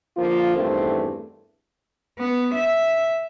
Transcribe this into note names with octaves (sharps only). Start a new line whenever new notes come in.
D3 F3 A#3 F4
E2 G2 D#3 A3 C4
B3
E5